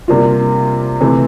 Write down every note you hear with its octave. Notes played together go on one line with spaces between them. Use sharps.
C3 G3 A#3 D4 F4
C3 E3 A3 C4